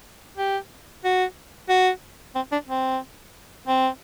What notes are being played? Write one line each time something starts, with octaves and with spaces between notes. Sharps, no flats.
G4
F#4
F#4
C4
D4
C4
C4